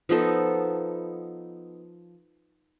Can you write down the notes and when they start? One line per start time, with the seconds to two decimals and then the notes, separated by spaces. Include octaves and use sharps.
0.09 F3 B3 D#4 A4